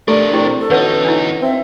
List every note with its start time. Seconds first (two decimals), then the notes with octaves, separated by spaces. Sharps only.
0.08 A3 D4 G4 A4 A#4 D5
0.33 C4 E4 G4
0.58 A4
0.70 E2 C#4 D#4 F#4 B4 C#5
1.05 D4 E4
1.41 C4 E5